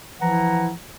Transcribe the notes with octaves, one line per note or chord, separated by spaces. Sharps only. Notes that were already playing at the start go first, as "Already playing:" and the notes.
E3 F3 E4 F#5 A#5